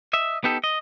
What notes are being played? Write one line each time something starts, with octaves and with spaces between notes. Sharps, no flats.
D#5 E5
B3 D#4 G4 A4
D#5